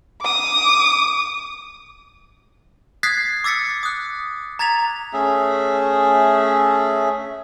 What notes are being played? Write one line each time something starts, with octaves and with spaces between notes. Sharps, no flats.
D6 D#6
D#6 F#6 G#6 A6 B6 C7
D6 E6 A6 B6 C#7
D#6 F#6
A#5 G#6 A6 B6 F7
A3 C#4 G#4 E5